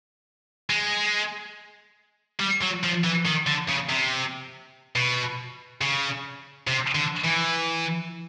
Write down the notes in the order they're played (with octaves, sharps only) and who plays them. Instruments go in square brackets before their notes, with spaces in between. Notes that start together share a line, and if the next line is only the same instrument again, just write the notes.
[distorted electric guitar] G#3
G3
F#3
F3
E3
D#3
D3
C#3
C3
B2
C#3
C3
D3
E3